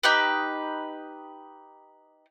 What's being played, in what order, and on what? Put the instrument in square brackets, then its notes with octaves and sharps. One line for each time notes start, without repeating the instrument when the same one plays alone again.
[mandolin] D#4 G4 B4